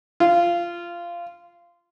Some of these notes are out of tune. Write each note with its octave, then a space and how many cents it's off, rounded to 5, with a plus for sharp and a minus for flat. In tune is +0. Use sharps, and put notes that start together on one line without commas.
F4 -15